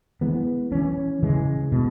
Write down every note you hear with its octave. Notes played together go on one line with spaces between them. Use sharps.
E3 G#3 B3
E3 C#4
C#3 E3 G#3
B2